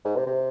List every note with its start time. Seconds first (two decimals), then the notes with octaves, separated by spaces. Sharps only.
0.04 G#2
0.16 C3
0.26 C3